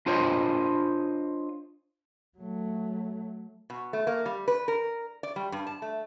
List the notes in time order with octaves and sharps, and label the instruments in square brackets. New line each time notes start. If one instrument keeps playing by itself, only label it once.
[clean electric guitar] D4 F4 C5 C#5 D#5
[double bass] F#3 A3
[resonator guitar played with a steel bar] B2
A3
A#3
G3
B4
A#4
D5
G3
G2
A5
A3